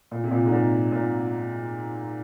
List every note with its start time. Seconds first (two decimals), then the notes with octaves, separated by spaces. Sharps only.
0.11 A#2
0.24 C3
0.31 A#2
0.46 G#2
0.52 A#2
0.92 A#2